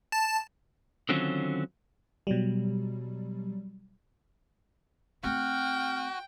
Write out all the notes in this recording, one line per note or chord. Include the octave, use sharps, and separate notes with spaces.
A5
D3 D#3 F#3 C4 C#4 F4
B2 F#3 G3
A3 C4 F#4 G5 F6